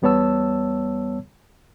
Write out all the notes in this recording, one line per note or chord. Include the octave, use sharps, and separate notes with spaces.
E2 G3 B3 C#5 A5 E6